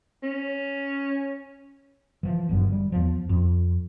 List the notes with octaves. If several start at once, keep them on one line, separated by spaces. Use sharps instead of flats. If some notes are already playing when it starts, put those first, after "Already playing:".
C#4
E3 F3
G1 F#2 D3
G3
E2 F3
F2